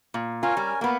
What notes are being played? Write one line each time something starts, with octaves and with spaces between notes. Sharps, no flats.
A#2
C#4 F4 A#4 G#5
G3
A#3 B3 F#4 A#4